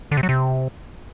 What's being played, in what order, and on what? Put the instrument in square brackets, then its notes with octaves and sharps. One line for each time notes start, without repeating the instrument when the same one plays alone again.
[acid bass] D3
C3
F#3
C3